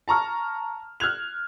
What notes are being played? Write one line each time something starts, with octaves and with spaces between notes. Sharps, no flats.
A5 A#5 C#6 F6
F6 F#6 G#6 F7